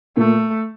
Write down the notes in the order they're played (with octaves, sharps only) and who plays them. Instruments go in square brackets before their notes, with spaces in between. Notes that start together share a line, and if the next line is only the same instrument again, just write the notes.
[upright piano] A#2 [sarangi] A3